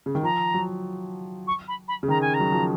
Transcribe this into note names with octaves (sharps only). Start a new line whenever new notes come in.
C#3
D#3
F3 A#5
F#3
C#6
B5
B5
C#3
D#3 A#5
G#5
A#5
F#3
F3